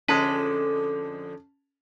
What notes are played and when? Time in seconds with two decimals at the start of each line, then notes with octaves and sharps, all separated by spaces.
0.08 F2 D3 G#3 C#4 A4 B4 A5